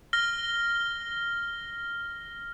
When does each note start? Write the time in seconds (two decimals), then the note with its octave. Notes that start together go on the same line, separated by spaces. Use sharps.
0.13 F6 A#6 G7